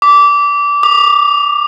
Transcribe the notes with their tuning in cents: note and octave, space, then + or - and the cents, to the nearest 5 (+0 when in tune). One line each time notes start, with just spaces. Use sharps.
D6 -20
D6 +30